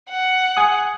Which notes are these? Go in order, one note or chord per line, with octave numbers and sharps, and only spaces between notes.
F#5
G#5 D#6